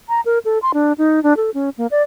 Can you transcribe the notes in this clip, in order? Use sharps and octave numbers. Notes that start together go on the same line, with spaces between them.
A#5
A#4
A4
C6
D4
D#4
D4
A4
C#4
A#3
D5